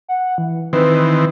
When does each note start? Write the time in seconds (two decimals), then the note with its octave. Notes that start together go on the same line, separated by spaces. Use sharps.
0.09 F#5
0.38 E3
0.73 D#3 E3 C4 B4